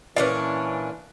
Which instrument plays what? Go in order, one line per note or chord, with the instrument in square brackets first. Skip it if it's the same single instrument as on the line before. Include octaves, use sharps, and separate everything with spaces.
[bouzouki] A#2 C#4 D4 [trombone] E3 [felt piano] B4 D5